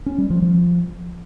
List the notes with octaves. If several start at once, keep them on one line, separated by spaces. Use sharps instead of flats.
C#4
G3
F3
F3